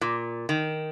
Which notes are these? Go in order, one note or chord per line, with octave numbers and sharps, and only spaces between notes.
A#2
D#3